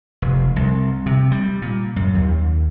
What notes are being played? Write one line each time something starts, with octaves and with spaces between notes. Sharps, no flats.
F1
C2
C3
G3
A#2
F#2
D#2